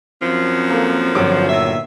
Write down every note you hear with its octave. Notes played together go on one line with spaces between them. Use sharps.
F#2 F3 C4
A#3 A4 A#4
G1 F2 F#3 D6
A#2 D#3 E5